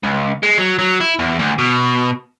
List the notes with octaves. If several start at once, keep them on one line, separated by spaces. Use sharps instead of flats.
C#2
G#3
F#3
F#3
E4
E2
D2
B2